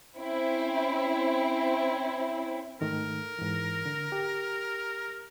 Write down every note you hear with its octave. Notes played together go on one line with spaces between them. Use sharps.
C4 C#4 E4
G#2 D#3 A3 A#4
G#2 E3
D3
G4